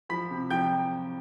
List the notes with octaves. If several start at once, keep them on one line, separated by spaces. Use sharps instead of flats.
F3 B5 B6
C3
F3 G5 G6